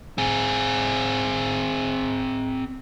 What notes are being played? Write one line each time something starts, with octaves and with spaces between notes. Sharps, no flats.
C4 G#4